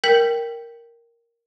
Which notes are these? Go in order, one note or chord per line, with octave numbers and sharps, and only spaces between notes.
A#4 G5 G6 B6 F#7